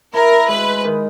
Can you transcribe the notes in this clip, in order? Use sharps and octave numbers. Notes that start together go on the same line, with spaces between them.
E4 A#4
G#3 B4
D#3